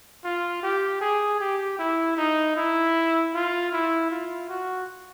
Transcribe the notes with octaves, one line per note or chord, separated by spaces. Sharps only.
F4
G4
G#4
G4
E4
D#4
E4
F4
E4
F4
F#4